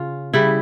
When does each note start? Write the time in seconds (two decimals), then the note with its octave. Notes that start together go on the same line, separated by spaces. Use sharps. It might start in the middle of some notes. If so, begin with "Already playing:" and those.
Already playing: C#3 C#4 F4
0.33 C#3 G3 E4